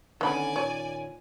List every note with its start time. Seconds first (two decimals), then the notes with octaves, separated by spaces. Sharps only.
0.21 D3 D#3 B3 C#4 D5 G#5 B5
0.56 A#2 C#5